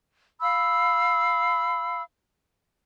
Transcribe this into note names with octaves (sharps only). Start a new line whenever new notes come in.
F5 B5 E6